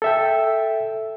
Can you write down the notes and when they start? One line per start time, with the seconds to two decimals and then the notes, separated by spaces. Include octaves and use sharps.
0.02 A4 E5 G5